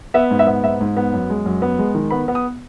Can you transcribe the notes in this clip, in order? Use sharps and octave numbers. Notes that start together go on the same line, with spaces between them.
B3 E5
G#2
E5
B3
G#2 E5
G#2
B3
F#2
G#3
F#2
B3
G#3
D#3
B3 B5
B3
D#6